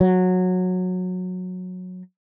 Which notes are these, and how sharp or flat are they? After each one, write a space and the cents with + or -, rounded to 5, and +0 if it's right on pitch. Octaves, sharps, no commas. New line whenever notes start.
F#3 -15